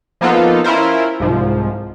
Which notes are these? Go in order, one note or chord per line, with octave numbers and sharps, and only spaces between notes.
F3 A#3 B3 D#4 F4 A4
C#4 E4 F4 A#4 C5
C2 G#2 F3